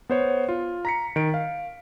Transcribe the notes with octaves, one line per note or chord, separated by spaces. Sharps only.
B3 C5 C#5
F4
A#5 B6 C#7
D#3 D7
F5